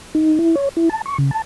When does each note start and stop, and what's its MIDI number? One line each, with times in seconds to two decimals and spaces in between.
0.15 0.39 63
0.39 0.55 64
0.55 0.69 73
0.77 0.89 64
0.90 1.02 81
1.06 1.18 85
1.18 1.31 49
1.31 1.42 81